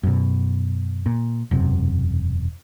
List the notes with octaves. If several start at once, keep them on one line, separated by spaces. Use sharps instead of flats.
F#2 B2
A#2
E1 F#2 C3